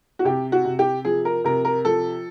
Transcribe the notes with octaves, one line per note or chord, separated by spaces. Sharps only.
F#4
C3 G4
F#4
C3
G4
F3 G#4
A#4
C3 A#4
A#4
F3 A4